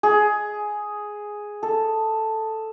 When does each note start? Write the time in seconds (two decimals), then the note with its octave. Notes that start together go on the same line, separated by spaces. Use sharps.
0.03 G#4
1.63 A4